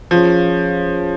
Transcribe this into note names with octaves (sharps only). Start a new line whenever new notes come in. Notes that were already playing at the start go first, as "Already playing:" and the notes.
F3 C#4 G#4 C#5 F5